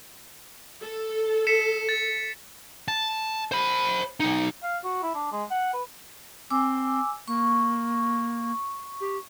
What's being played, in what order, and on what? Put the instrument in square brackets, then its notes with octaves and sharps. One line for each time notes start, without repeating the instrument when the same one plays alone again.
[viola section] A4
[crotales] B6 C#7 E7
A6
[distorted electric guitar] A5
C5 B5
B1 D#4
[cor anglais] F5
F#4
E4
D4
G#3
F#5
B4
[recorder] C4 [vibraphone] G#5 D6 E6
[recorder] A#3 [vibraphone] C#6
[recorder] G4